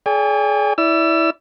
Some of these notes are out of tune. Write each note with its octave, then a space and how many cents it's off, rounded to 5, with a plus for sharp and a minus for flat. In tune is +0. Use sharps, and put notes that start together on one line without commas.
G#4 +35 D5 -40 G#5 -45
E4 -10 D5 -20 E6 +30